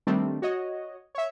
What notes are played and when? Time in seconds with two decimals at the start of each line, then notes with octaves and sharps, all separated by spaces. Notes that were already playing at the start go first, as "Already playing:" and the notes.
0.07 D#3 G3 A3 C4 D4
0.42 F#4 C#5 D#5
1.15 C#5 E5